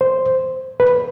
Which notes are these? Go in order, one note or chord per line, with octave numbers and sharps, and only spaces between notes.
C5
B4